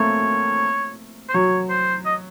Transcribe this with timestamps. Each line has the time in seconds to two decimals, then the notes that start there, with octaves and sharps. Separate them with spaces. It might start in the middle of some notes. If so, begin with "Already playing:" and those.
Already playing: A3 A#3 C4 C#5
1.29 C5
1.34 F#3 C#5
1.70 C5
2.06 D#5